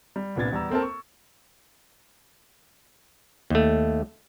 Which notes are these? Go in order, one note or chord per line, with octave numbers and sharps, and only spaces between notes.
G3
C2 A#2 B3 D4 G#6 A6
E2 G3 A#5 E6
A#3 C4 A4 A#4 A5
C#6
D#2 A3